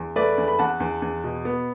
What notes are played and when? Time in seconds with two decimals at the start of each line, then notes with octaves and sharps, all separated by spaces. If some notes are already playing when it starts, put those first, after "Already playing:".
Already playing: E2
0.16 A3 B4 D5
0.38 E2
0.48 B5
0.59 E2 F#5 A5
0.80 E2
1.02 E2
1.24 B2
1.45 B3